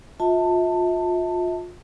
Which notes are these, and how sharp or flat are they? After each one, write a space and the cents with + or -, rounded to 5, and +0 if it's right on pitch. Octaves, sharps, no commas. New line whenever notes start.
F4 +30 E5 -35 A5 +15